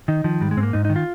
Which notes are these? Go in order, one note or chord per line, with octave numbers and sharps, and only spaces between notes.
D#3 D#4
D#3 F3
G#2 G3
G#3
G#2 C4
A#3
G#2 D#4
D#3 D#4
F4